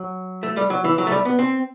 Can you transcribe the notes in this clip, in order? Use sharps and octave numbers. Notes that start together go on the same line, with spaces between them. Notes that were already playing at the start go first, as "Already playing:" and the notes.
Already playing: F#3
A3
G3
F#3
E3
F#3
A3
G3
B3
C4